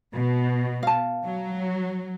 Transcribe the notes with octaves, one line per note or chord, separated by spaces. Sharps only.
B2
F5 A5
F#3